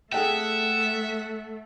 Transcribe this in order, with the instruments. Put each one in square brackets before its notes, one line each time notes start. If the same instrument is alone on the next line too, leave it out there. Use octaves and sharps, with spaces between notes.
[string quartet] A3 [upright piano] G#4 A4 G5 [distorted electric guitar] E5 [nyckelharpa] F#5